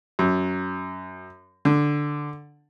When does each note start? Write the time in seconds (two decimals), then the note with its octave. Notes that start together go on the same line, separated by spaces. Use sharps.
0.19 F#2
1.65 D3